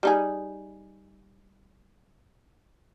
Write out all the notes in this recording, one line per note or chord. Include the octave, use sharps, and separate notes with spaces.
G3 D#4 G#4